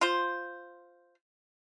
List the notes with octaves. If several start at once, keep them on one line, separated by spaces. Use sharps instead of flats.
F4 C5